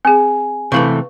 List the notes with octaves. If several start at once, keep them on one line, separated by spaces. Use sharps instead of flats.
C4 G#4 G#5
C3 E3 A3 B4 F5 C#6